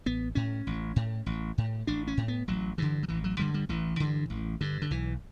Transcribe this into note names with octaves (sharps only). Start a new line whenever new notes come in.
A1 B3
A2 C#4
A1
A2
A1
A2
A1 D4
C#4
A2
B3
A1 F#3
G2 D3 E3
F#3
A1 E3
F#3
G2 D3 G3
G3
A1 E3
G2 D3
A1
G2 D3
D3
B1 E3